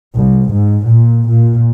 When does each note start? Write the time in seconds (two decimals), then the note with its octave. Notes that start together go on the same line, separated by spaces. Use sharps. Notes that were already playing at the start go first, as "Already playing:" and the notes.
0.17 C2
0.52 G#2
0.85 A#2
1.29 A#2